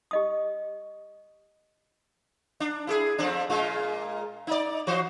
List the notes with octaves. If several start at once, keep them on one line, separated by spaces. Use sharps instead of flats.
G4 D#5 D#6
D4
E4 G4 G#4
F2 C4 D4
A#2 G#3 F4
D#4 D5
E3 F#4 C5